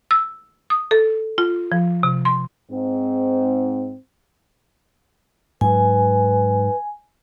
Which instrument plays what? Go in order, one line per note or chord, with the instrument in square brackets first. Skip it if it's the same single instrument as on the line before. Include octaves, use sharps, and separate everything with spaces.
[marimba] E6
D#6
A4
F4
F3
C3
C6
[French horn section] G#2 C4
[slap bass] G#2 F#3 [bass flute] B4 [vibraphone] G#5